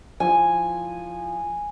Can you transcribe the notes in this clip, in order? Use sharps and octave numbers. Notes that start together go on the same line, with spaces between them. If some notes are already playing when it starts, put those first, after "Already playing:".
F3 E4 G#5